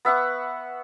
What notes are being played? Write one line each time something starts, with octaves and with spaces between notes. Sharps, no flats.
B3 E5 F#5 C#6